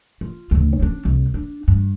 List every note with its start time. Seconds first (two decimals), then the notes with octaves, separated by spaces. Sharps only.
0.21 F4
0.51 D2 C#3
0.80 C#4 D4
1.05 C2
1.34 D4
1.68 G2